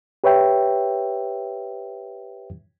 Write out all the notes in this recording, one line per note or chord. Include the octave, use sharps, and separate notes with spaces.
G4 B4 C#5 E5 G5